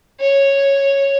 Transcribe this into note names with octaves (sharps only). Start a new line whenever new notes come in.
C#5